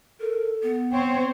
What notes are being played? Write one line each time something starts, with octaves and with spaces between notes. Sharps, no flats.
A4 A#4
B3
C4 C5 C#5 G5